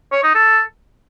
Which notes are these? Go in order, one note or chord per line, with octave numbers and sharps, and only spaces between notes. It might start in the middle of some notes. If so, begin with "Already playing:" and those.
C#5
D#4
A4